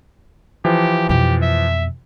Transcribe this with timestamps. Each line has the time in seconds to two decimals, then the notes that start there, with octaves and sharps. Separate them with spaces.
0.65 E3 F3 G4
1.09 F2 B2 G4
1.42 E5